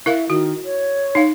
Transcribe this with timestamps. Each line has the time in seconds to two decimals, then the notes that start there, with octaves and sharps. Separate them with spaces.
0.06 E4 A#4 E5 F5
0.30 D#3 F#4
0.65 C#5
1.15 D#4 F5